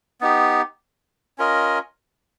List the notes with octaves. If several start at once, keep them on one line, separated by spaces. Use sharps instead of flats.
B3 D#4 G4
C#4 F4 A#4 D#5